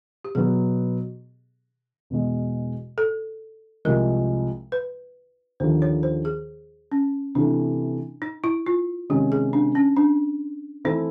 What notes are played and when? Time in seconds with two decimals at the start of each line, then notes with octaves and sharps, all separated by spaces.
0.25 G4
0.35 B2 F#3 B3 G#4
2.10 E2 B2 G#3
2.98 A4
3.85 C2 C3 F3 G#3 A#4
4.72 B4
5.60 D#2 D3 F3 C5
5.82 C#5
6.03 C5
6.25 G#4
6.92 C#4
7.35 C3 E3 A3 D4
8.22 D#4
8.44 E4
8.66 F4
9.10 C3 D#3 G#3 C#4 G4
9.32 G#4
9.53 D4
9.75 C#4
9.96 D4
10.85 E3 A3 C4 D#4 E4